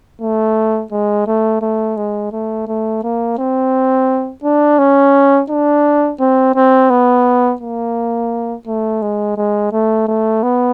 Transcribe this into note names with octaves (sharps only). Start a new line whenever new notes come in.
A3
G#3
A3
A3
G#3
A3
A3
A#3
C4
D4
C#4
D4
C4
C4
B3
A#3
A3
G#3
G#3
A3
A3
B3